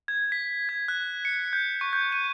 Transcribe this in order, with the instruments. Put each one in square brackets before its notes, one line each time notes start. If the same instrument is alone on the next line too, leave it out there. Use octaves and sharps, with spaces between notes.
[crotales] G#6
B6
G#6
F#6
C#7
G6
C#6
G6
D#7